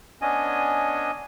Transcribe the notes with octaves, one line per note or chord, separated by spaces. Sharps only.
B3 C#4 D4 D#5 G#5